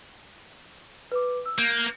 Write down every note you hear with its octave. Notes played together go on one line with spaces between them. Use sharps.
B4 D6
E6
A#3 G6